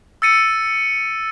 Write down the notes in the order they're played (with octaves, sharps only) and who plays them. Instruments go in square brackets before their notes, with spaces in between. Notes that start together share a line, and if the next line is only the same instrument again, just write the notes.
[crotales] E6 A6 C#7 D#7